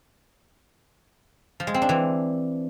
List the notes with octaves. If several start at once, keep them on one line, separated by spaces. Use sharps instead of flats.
F3
G#3
C4
D4
E3